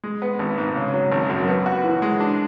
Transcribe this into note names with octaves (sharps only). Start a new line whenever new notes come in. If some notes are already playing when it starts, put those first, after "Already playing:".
G#3
B3
G#1
G#2
C#3
F#3
G#1
F#2
B3
F#4
E3
G#3
D4